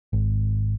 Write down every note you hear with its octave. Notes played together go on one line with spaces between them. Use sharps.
G#1